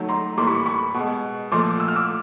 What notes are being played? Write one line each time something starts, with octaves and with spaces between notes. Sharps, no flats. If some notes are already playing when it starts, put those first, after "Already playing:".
Already playing: D#3 F#3 A3
A#5 C6
A2 E3 G3 A#3 C6 D6
B5 C#6
B5 C#6
B2 G#3
A#2 F3 A3 C6 D6
E6
F6
D6 E6